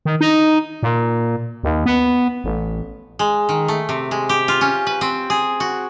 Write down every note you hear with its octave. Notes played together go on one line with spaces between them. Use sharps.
D#3
D#4
A#2
D#2
B3
A1
G#3
D#3
A3
C3
G#3
G4
F4
C#4
B4
C4
G#4
F#4